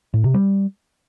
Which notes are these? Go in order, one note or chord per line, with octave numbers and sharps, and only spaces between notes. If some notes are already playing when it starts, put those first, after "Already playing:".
A2
C3
G3